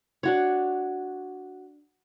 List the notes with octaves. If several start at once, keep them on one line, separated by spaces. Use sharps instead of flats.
D4 F#4 C#5